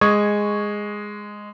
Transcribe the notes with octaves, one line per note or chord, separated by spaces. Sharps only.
G#3 C#6 D#6 G#6